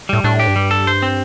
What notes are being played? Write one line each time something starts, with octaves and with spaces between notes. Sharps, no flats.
A2 G3
A2 D4
G4
G2
G3
A4
C5
C4